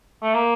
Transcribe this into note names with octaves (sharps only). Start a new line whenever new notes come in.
A3
A#3